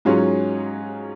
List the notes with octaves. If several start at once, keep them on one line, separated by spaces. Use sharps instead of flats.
G#2 F#3 C#4 F4 G#4